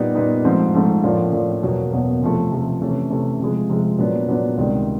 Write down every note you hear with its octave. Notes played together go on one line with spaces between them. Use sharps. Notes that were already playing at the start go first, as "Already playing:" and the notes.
Already playing: A#2 G3 B3 D#4
A#2 G3 B3 D#4
G#2 F3 A3 C4
G#2 F3 A3 C4
A2 F3 A#3 D4 F4
A2 F3 A#3 D4 F4
E2 B2 F#3 A#3
E2 B2 F#3 A#3
C3 F3 A3
C3 F3 A3
C3 E3 A3 C#4
C3 E3 A3 C#4
C3 F3 G#3
C3 F3 G#3
A#2 F#3 B3 D4
A#2 F#3 B3 D4
C#2 C3 D#3 G3